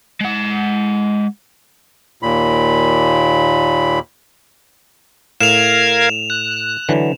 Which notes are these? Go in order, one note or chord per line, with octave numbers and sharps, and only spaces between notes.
G#3 F#5
D#2 A#2 B5
A2 A#4 F5 G#6 E7 F7
F#6
D3 E3 F#3